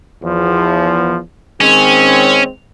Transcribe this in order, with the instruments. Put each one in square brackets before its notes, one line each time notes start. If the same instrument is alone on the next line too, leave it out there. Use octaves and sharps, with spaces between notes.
[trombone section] E2 F3
[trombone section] D#3 G#3 C4 [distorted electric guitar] C#4